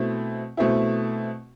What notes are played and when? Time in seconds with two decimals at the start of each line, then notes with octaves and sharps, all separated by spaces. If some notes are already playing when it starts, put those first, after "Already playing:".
Already playing: B2 A3 C4 E4
0.57 B2 A3 C4 E4